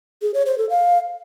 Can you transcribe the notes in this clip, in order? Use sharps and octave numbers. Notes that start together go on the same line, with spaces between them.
G#4
C#5
C5
A4
F5